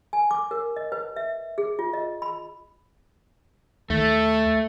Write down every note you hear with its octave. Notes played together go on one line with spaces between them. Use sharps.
G#5
D6
A#4
D#5
B4
E5
G#4
F4
D#5
B5
D#2 A3 A4